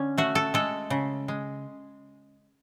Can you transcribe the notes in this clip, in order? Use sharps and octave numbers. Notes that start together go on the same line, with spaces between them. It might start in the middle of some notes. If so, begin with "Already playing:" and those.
Already playing: D3 C#4
A3 F#4
A4
G#3 A4
C#3
G#3